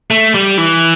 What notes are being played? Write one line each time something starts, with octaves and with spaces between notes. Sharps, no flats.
A3
G3
E3